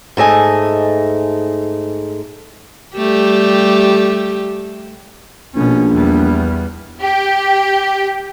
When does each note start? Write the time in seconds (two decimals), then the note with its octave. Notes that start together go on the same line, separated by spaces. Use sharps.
0.17 G#2 A3 D#5 G#5
2.96 G3 A3 G4
5.55 A#1 B2 C#4
5.93 E2 G3
7.03 G4